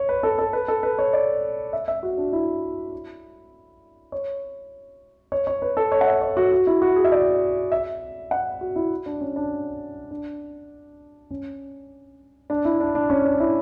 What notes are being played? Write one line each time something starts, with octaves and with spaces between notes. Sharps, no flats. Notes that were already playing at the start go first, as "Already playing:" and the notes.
Already playing: C#5
B4
A4
A4
B4
A4
B4
C#5
D5
E5
E5
F#4
D4
E4
C#5
C#5
C#5
B4
A4
C#5
F#5
E5
C#5
F#4
F#4
E4
F#4
G#4
E5
D5
E5
F#5
F#4
E4
D4
C#4
D4
D4
C#4
D4
E4
D4
D4
C#4
D4
E4